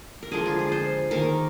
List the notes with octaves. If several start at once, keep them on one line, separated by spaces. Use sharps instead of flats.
A#4
D3 F3 G#3 G#4
F4
G#4
C5
D#3 A#3 A#4